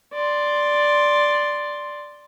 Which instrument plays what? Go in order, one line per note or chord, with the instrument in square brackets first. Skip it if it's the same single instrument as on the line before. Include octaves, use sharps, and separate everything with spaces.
[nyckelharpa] D5 C6